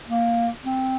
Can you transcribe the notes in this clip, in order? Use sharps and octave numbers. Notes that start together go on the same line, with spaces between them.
A#3
C4